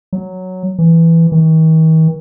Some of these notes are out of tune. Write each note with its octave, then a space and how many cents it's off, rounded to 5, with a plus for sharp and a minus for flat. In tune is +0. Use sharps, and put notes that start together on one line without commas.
F#3 +0
E3 +5
D#3 +45